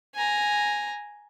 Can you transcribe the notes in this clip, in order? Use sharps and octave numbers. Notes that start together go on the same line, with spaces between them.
G#5 A#5